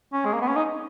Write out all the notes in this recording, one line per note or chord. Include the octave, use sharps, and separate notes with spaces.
C#4
G#3
A#3
B3
C#4
D#4